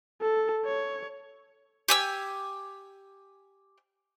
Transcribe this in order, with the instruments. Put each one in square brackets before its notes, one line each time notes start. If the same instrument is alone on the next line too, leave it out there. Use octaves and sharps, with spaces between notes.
[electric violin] A4
C#5
[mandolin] G4 G#5 E6